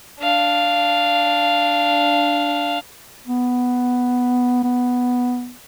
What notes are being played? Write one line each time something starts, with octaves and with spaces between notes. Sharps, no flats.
D4 F5
B3
B3